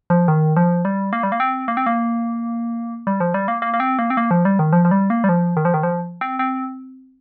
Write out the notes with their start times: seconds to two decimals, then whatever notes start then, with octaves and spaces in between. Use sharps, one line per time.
0.10 F3
0.28 D#3
0.57 F3
0.85 G3
1.13 A#3
1.23 G3
1.32 A#3
1.40 C4
1.68 A#3
1.77 C4
1.86 A#3
3.07 G3
3.20 F3
3.34 G3
3.48 A#3
3.62 A#3
3.74 A#3
3.80 C4
3.99 A#3
4.10 C4
4.17 A#3
4.31 F3
4.45 G3
4.59 D#3
4.73 F3
4.85 F3
4.91 G3
5.10 A#3
5.24 G3
5.29 F3
5.57 D#3
5.65 F3
5.74 D#3
5.83 F3
6.21 C4
6.39 C4